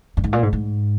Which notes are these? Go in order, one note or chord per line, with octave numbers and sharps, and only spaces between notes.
G2
G#2
A#2
G#2
G#2